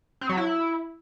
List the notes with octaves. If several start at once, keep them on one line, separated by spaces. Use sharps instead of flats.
C4
F#3
E4